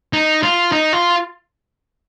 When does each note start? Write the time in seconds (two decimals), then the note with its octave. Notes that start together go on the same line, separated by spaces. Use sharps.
0.13 D#4
0.43 F4
0.72 D#4
0.93 F4